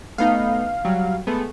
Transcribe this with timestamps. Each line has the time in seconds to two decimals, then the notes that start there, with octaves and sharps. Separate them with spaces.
0.18 A3 B3 D#4 F5
0.85 F#3 G3
1.27 G#3 A3 B3